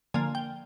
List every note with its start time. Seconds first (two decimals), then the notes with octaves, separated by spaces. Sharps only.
0.14 D3 F3 A#3 G#5
0.35 G5